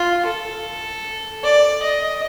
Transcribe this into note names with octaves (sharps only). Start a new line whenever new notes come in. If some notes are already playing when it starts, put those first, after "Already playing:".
Already playing: F4
A4
D5
D#5